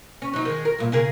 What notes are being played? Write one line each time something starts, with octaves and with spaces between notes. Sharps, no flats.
C#4
F#3 D#4
D#3 G#3
A#4
G2 A#2
C#3 G#4 A#4